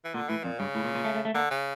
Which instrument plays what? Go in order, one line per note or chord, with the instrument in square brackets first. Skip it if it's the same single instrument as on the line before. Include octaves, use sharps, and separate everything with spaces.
[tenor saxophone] E3
[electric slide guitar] A#2 [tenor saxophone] D3
[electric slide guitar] A2 [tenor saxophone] E3
[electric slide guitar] F2 [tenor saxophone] A#2
[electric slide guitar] G2 [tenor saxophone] C#3
[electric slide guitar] A2
A#2
A#2
A3
A3
A3
[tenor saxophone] D3 [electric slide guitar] A#3
[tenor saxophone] C#3